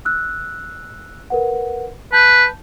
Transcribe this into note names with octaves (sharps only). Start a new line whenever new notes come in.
E6 F#6
A#4 B4 F#5
B4 A5 G6